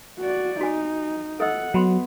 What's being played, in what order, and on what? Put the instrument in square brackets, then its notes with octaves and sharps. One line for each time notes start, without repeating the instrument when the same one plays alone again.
[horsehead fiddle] F#4 D5
[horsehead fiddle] D#4 [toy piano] F#4 G#5
[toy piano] A4 D#5 E6 [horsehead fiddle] F#5
[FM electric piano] F#3 [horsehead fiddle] B3 [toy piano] F#5 B5 C6